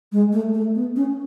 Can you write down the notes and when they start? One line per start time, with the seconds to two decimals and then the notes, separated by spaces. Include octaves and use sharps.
0.12 G#3
0.33 A3
0.54 A3
0.75 B3
0.96 C#4